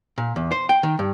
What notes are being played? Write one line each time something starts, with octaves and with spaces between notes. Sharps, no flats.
A#2
E2
C5
G5
D#3
G2